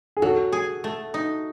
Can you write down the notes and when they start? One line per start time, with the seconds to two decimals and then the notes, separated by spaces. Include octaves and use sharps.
0.17 G#4
0.22 F#3 F#4 A4
0.52 G#4
0.84 A3
1.14 D#4